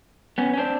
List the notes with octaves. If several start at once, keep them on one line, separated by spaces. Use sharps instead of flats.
B3 C#4
C#4
C4 D4